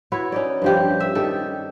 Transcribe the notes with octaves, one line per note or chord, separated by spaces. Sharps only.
E4 F#4 B4 C#5
C#4 D#4 D5
G2 F3 G4
E5
D#3 G4 A4